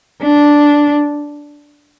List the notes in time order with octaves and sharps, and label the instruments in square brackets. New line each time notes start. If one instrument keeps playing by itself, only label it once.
[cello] D4